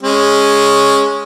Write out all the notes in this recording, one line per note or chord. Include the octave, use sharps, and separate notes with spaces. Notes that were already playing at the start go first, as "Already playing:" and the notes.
G#3 C#4